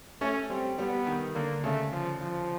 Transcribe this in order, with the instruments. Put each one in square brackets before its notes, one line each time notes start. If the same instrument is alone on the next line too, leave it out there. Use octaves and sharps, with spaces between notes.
[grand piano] A3 [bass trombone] C#4
[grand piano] G3 [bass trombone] C4
[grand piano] G3 [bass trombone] B3
[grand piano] D#3
[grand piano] D3 [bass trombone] A#3
[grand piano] C#3 [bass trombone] A3
[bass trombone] F3
F3